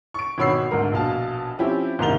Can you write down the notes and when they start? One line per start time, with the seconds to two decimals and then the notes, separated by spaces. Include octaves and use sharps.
0.14 C#6 D7
0.38 G#1 B2 C#5 B5 E6 C7
0.71 D2 G#2 A#4
0.92 A#1 B2 F5 A5
1.59 F3 C4 C#4 E4 G4
1.99 F#1 C2 G#2 D#3 F7 G7